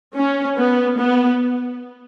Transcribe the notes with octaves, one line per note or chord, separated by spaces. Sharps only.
C#4
B3
B3